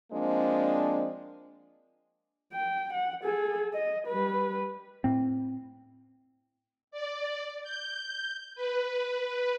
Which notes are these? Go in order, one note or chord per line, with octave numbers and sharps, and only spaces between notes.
F3 G#3 A#3 C4 D4
G5
F#5
G#4 A4
D#5
G3 B4
A2 C4
D5
G6
B4